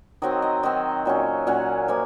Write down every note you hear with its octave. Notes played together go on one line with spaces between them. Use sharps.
D#3 F#3 C4 D#5
D#5
D#3 F#3 C4 D#5
A#2 F#3 C#4
A#2 F#3 C#4 F#5
F3 A#3 G#5